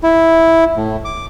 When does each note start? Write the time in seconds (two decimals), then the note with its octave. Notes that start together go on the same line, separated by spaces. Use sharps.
0.03 E4
0.77 A2
1.05 D6